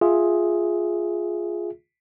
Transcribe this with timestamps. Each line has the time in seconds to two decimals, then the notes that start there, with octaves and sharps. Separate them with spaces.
0.01 F4 G#4 E5